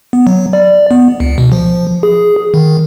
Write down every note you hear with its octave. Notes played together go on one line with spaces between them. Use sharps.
B3
F#3
D5
B3
C#2
B2
F3
G#4
D#3